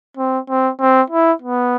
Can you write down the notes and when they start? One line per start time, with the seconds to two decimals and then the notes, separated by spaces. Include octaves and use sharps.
0.17 C4
0.49 C4
0.80 C4
1.10 E4
1.42 B3